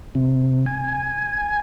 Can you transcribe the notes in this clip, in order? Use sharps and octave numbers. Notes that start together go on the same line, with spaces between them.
C3
G#5